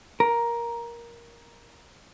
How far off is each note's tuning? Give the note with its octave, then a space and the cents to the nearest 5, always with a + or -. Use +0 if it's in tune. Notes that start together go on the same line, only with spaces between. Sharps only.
A#4 +10